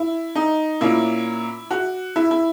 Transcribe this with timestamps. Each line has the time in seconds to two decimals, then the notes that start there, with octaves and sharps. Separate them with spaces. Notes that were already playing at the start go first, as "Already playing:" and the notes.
Already playing: E4
0.35 D#4
0.81 A#2 A#3 C#4 E4
1.71 F#4
2.16 E4
2.31 E4